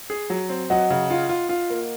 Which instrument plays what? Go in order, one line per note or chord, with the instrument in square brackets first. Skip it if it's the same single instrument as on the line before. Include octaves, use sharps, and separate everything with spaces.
[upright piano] G#4
F#3
C4
[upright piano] F#3 [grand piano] D#5 F#5
[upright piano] C#3
F4
F4
F4
A#3